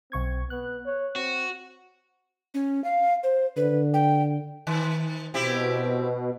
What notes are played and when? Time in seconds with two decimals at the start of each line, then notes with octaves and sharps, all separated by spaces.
0.12 B1 C4 C#6 G#6
0.50 B3 F#6
0.86 C#5
1.16 C4 F#4
2.54 C#4
2.84 F5
3.23 C5
3.57 D3 B4
3.94 G5
4.67 D#3
5.34 B2 C4 E4 G4